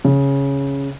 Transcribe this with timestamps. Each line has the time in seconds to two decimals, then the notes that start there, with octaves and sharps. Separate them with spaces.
0.05 C#3